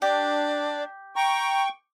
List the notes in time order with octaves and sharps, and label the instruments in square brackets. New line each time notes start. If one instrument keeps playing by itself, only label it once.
[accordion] D4 [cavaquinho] G4 [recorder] D5
[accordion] G5 C#6 [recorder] A#5